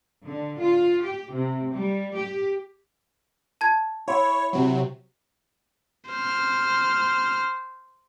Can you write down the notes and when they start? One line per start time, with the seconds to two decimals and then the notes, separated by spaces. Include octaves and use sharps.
0.24 D3
0.60 F4
1.04 G4
1.33 C3
1.73 G3
2.16 G4
3.61 A5 G#6
4.08 E4 C#5
4.53 C3 F#3
6.11 C5 F6